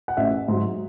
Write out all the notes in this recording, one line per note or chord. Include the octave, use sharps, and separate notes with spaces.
F#5
A1 E5
G#2 F#3